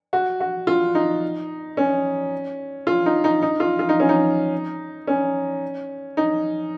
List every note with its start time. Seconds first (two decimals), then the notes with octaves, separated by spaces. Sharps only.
0.13 F#4
0.40 F#4
0.67 F4
0.95 D#4
1.77 C#4
2.87 F4
3.06 D#4
3.24 D#4
3.42 D#4
3.60 F4
3.79 F4
3.89 D#4
4.00 C#4
4.09 D#4
5.07 C#4
6.17 D#4